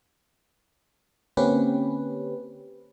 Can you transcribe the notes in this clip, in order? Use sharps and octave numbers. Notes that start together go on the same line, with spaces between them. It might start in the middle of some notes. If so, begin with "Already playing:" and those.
D3 A#3 C4 C#4 G4 B4